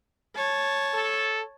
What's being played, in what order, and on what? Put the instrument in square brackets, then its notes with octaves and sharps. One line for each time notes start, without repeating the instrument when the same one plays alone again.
[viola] C#5 A5
[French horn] A4